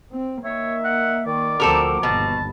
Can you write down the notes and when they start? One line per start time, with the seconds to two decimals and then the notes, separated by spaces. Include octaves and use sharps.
0.12 C4
0.44 D#3 A#3 C#5 E5
0.84 F#5
1.26 D#3 D5
1.60 D2 F3 C4 F#4 A4 A#4 A#5 D6
2.03 G1 D#2 B2 A5